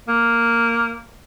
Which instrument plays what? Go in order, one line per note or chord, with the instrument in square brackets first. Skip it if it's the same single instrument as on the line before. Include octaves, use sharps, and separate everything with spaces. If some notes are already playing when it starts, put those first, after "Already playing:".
[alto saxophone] A#3